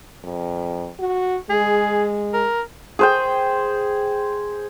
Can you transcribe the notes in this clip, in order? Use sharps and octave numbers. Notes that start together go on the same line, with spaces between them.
F2
F#4
G#3 G#4
A#4
G#4 C5 G5